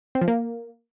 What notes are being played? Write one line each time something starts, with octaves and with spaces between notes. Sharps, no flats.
C4
F3
A#3